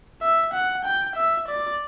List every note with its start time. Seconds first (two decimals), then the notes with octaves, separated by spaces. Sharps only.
0.22 E5
0.54 F#5
0.85 G5
1.16 E5
1.48 D5